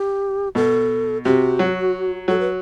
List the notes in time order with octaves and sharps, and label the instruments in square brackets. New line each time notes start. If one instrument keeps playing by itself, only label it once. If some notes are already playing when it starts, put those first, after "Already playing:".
Already playing: [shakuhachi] G4
[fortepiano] B2 [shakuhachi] A4
[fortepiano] C3 [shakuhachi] F#4
[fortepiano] F#3
[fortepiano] F#3 [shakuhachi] A4
[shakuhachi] B4